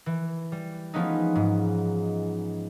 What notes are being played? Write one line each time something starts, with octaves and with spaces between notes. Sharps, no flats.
E3
G3
F3 G#3 A3 B3 C#4 D#4
G#2